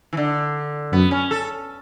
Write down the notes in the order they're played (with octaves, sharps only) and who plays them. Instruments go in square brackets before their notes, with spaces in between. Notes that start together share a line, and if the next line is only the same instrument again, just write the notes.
[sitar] E3
D3
[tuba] F#2 [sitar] B3
[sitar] C#4
A4